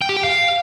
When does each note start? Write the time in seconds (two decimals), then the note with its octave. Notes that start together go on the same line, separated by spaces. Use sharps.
0.02 G5
0.09 G4
0.17 G5
0.24 F5